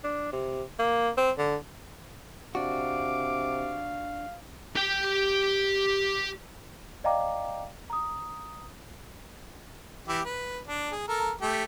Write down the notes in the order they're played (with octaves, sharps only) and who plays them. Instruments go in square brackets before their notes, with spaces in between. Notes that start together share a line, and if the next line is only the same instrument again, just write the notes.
[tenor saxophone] D4
C3
A#3
C4
D3
[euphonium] C3 [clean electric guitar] D4 F#4 [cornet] F5 [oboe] D6
[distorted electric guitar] G4 G5
[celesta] D5 D#5 F5 G5 A#5 D6
A#5 D#6
[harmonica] E3 E4 G4
B4
D4
G#4
A4 A#4
A3 G4